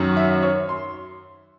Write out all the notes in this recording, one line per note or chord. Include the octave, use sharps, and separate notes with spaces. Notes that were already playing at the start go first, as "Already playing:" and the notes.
Already playing: F#2 D#3 F#3
E5
C#5
C6